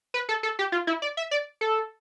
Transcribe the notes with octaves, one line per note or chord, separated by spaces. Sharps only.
B4
A4
A4
G4
F4
E4
D5
E5
D5
A4